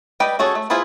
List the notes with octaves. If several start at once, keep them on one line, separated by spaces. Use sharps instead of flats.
G3 G4 B4 D#5 G5
C#4 F#4 G#4 A4
A3
B3 E4 F4 G#4 C5